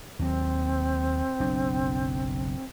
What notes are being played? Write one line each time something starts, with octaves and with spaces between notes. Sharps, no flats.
D#2 F#3 C4
F#1 B1 D4